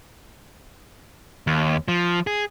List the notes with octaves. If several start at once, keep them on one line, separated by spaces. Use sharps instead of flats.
D#2
F3
G#4